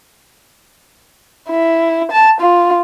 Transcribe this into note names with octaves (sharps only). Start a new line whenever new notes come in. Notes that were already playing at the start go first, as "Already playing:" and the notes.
E4
A5
F4